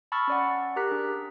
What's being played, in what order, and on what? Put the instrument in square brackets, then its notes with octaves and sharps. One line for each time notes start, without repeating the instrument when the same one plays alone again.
[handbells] A5 B5 C#6 E6 F6 A6
C#4 D5 F#5
G4 A#4 A#5 F#6 B6
D4 G#4